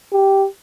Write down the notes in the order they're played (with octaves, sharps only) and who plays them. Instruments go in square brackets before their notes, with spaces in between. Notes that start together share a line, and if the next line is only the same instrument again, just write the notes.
[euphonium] G4